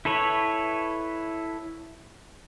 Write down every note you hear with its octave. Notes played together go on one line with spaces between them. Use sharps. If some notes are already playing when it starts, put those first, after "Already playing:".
E4 A4 B4 C#5